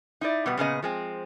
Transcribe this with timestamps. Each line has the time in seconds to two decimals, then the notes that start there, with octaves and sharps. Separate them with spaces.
0.21 D#4 E4 D5
0.46 B2 G3 B3
0.57 A#2 C#3 B3 D#5
0.83 F3 G#3 C4